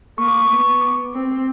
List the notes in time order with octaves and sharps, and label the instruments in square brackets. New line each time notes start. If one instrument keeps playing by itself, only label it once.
[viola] A#3 [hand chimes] C#6
[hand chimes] D6
C#6
[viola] B3 [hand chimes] D6
[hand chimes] C#6
D6
[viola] C4